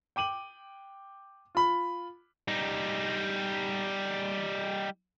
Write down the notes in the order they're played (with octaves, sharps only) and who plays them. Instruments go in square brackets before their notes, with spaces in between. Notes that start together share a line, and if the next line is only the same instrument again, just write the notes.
[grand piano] G5 D6 D#7 F#7
F4 B5
[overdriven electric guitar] G3 D#4